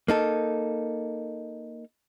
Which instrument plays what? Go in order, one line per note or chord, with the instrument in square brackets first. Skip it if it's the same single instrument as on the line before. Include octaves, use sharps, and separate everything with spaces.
[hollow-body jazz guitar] A#3 D#4 A4